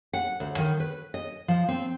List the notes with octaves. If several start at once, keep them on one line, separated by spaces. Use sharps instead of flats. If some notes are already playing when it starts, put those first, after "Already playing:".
F#5
D2
D#3
B4
D#5
F3
C4